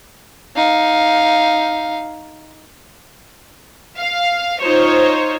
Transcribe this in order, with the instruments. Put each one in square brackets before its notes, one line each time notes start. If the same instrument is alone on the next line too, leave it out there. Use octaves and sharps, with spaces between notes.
[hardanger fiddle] D#4 F5
[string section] F5
D#4 F4 C5 C#5